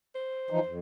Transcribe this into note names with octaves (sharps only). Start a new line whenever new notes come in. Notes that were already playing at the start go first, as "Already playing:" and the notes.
C5
E3 F3 D#4
F2